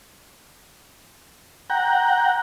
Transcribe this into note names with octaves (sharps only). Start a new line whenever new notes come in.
F#5 G5 A#5